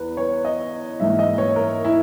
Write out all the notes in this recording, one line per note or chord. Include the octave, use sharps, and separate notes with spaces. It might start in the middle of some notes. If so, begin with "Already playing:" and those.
Already playing: E2 B4
C#5
D#5
G#2 E3 A#3 E5
D#5
C#5
A#4
E4